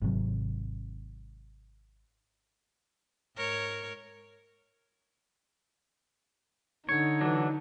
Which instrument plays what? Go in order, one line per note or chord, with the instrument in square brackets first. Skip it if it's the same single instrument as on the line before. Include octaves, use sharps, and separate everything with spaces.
[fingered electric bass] G#1 C3 F#3
[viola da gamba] G#2 A#4 C#5
[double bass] D3 [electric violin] D#4 [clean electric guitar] C#5
[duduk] E3 [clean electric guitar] F#3 D4